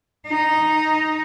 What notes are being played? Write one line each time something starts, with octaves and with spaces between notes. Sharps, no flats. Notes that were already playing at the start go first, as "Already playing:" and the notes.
D#4